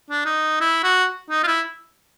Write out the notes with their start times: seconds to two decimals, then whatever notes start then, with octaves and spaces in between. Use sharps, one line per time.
0.11 D4
0.25 D#4
0.61 E4
0.84 F#4
1.30 D#4
1.43 F4
1.47 E4